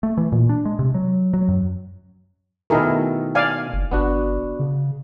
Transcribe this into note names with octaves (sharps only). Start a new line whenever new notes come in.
A3
E3
A#2
D4
G#3
C3
F#3
F#3
F#2
B2 D#3 A3 E4 G#4 A#4
D5 F5 G#5
F#1
G1 B3 D4 F#4
C#3